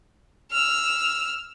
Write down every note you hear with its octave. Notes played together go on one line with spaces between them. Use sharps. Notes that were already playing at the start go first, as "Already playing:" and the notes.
E6 F6